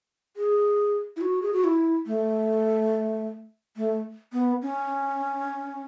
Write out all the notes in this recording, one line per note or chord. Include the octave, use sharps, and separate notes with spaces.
G#4
E4
F#4
G#4
F#4
E4
A3
A3
B3
C#4